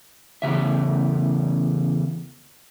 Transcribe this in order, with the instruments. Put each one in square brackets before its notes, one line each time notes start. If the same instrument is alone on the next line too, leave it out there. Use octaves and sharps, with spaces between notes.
[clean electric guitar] E2 G#2 C#3 E5